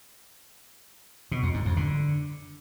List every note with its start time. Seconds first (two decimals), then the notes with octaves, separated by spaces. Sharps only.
1.31 B2
1.43 F2
1.54 G#2
1.65 F2
1.77 D3